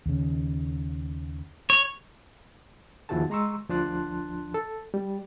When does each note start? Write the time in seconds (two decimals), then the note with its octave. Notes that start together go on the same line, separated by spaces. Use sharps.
0.06 D#2 C#3
1.70 C#5
3.09 D#2 F3 E4 F#4 G#4 A5
3.30 G#3 A#5 C6 C#6 E6
3.69 D2 F3 D4 A5 C6 F#6
4.54 A4
4.94 G3